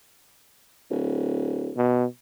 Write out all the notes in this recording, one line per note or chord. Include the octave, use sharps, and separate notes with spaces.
D1
B2